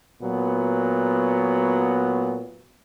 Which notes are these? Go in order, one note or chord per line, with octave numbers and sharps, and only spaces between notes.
A#2 F#3 B3